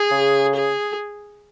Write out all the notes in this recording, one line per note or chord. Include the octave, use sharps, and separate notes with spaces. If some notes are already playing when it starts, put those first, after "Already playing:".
Already playing: G#4
C#3
G#4